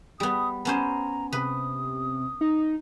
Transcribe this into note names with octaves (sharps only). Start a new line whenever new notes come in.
G3 B3 D#6
B3 C#4 C5 A#5
C3 B4 D#6
D#4